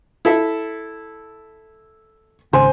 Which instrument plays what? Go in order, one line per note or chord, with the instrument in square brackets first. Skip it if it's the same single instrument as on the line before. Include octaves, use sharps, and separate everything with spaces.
[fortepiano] E4 A4 E5
[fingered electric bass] G#1 C#3 [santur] C5 G#5